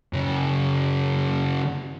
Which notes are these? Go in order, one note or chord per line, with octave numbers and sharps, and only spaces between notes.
F#2 C#3